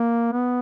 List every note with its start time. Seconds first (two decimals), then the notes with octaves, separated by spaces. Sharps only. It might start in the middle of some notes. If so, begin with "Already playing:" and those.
Already playing: A#3
0.32 B3